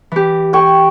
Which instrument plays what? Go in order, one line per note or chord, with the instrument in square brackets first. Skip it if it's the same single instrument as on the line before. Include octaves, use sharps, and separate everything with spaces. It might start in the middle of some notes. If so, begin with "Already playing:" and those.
[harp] E3 G4
[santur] G5 G#5 C#6